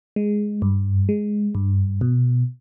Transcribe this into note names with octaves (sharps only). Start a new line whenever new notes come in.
G#3
G2
G#3
G2
B2